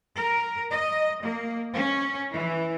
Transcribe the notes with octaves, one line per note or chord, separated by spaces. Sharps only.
A#4
D#5
A#3
C#4
E3